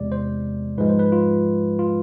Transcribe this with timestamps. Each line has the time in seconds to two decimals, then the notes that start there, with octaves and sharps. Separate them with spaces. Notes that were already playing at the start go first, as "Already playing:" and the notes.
Already playing: E2 C3 G#3 D5
0.12 C5
0.78 G#2 F3 G#3 B4
0.89 C5
0.99 B4
1.12 F4
1.79 F4